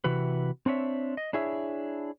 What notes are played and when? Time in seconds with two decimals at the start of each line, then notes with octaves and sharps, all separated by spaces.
0.04 C3 E3 F#4 B4
0.66 C4 D4 C#5 E5
1.17 D#5
1.33 D4 E4 G#4 C#5 E5